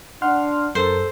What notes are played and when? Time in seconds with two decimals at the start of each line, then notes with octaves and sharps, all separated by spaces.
0.22 D4 F#5 C6 F6
0.75 F#2 A4 A#4 C5